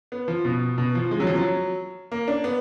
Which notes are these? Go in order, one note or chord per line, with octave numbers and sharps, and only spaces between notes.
B3
F3
B2
B2
F3
G#3
F#3
F3
F#3
A#3
D4
B3